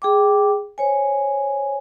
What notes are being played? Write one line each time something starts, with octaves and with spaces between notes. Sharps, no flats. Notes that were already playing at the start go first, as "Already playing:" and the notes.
G#4 G5 D6
C5 C#5 G#5